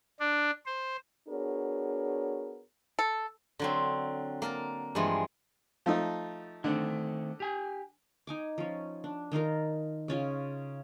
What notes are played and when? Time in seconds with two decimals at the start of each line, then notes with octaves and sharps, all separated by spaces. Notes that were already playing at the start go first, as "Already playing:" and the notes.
0.20 D4
0.66 C5
1.28 B3 D4 F#4 G#4 A#4 C#5
2.99 A4
3.59 D3 F#3 C4
4.42 A#3 A#4 A5
4.95 G2 E3 F3 G3 G#3
5.86 F3 A3 D#4
6.64 D3 D#3 A3 C4
7.40 G4 G#5
8.27 D#4 G#5 D6
8.58 F3 C#4
9.04 D4
9.32 D#3 D#4 F4 A#4
10.08 C#3 C#4 F4